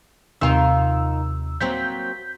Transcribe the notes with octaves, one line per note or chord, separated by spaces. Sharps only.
D#2 C3 D#3 F4 E6
F#3 A#3 C4 G6 B6